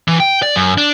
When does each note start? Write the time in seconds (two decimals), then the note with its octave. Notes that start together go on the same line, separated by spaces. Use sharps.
0.08 E3
0.20 G5
0.43 D5
0.56 F#2
0.78 D4